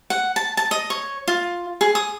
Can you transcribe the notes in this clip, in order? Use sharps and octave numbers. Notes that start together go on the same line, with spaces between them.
F#5
A5
A5
D#5
C#5
F4
G#4
D#6